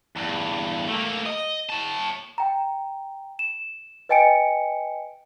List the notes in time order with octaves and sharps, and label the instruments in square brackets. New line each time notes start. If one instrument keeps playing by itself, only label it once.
[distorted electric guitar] E2 G2
A3 A#3
D#5
C#5 A5
[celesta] G5 A#5
E7
B4 D#5 G5 G#5 C#7 D7